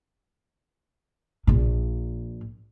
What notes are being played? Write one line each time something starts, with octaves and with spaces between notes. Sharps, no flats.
A#1 A#2